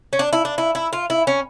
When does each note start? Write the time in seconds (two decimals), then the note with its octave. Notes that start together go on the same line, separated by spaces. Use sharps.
0.13 C#4
0.19 D4
0.33 E4
0.45 D4
0.58 E4
0.75 E4
0.93 F4
1.10 E4
1.27 C#4